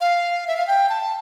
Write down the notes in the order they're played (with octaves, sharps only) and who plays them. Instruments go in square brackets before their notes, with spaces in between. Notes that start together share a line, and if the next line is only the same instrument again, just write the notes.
[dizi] F5
E5
F5
G5
A5